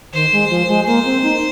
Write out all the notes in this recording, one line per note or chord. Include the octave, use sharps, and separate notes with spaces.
D#3 C5
G#3
F3
G#3
A#3 C5
C4
D#4